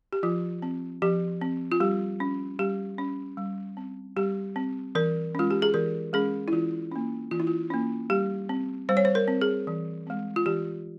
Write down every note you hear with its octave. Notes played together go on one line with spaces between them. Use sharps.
G4
F3 F4
C4
F3 G4
C4
F4
G3 G4
C#4
G3 G4
C#4
G3
C4
G3 G4
C4
E3 A#4
G#3 C#4 F4
G4
G#4
E3 A#4
G#3 C#4 G#4
E4
E3 F4
A#3 C#4
E3 F4
E4
F4
A#3 C#4
G3 G4
C4
G3 C5
C#5
C5
A#4
C4
G#4
E3
G#3 C4
F4
E3 G4